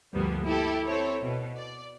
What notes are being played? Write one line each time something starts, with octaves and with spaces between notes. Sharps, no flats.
D2 G2 F3 G3 A#3 B3
E4 G4 A4
C4 E4 A4 C#5
B2
D5